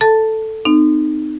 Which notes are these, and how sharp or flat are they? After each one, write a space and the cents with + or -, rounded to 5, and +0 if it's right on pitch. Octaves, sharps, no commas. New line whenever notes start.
A4 +0 A5 +10
C4 -40 D#4 -30